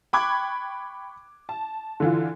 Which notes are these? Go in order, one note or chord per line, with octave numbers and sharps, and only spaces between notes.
G5 B5 C#6 D6 F#6 G#6
A5
D3 E3 F4